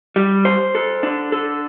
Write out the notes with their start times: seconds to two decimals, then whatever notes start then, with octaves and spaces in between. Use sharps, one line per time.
0.16 G3
0.45 C5
0.75 A4
1.03 D4
1.32 A4